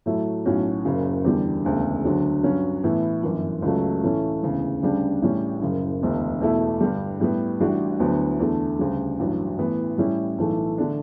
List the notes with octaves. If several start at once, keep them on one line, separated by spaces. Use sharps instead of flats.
A2 F#3 A3 E4
B1 A2 F#3 C#4 F#4
F#1 F#2 C#3 F#3
E2 D3 G3
E1 D2 C#3
D2 D3 F#3
G2 F#3 C#4
A2 E3 B3 E4
G1 F#2 E3
C#2 C#3 F#3 A3
A2 E3 A3 C#4
E1 D2 C#3 E3
D2 C#3 G3 D4
A1 A2 G3 C#4
F#1 F#2 C#3
E1 D2 D3
E2 B2 A3 E4
G2 D3 G3
A2 G3 B3
A1 A2 G3 D4 F#4
D2 D3 F#3 B3
E2 D3 A3
D2 C#3 G3
A1 G2 F#3
A1 A2 E3 B3
A2 G3 C#4 E4
B1 A2 E3 A3
D3 A3 D4